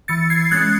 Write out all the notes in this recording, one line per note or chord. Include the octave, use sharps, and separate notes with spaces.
E3 A6 C#7
G#6 C7
G#3 C#4 F#6 A6